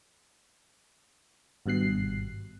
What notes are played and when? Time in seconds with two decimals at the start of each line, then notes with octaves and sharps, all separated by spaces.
1.66 G#1 G2 B2 F#6 C7